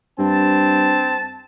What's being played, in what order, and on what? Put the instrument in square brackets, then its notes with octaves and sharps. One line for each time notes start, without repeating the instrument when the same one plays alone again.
[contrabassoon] G2 [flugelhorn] C4 [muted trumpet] A5